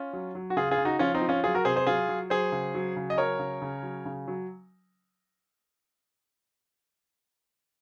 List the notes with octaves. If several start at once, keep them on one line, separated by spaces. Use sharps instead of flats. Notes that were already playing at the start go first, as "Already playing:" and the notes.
Already playing: C#4 F4
F#3
F#3
F#4
C#3 F4 G#4
F4 G#4
C#3
D#4 F#4
F3 C#4 F4
C4 D#4
F3
C#4 F4
F#3 F4 G#4
F#4 A#4
C3 G#4 C5
G#4 C5
F#3 F4 G#4
F#3
F#3 G#4 C5
C#3
F#3
C#3
D#5
F#3 A#4 C#5
C#3
C#3
F#3
C#3
F#3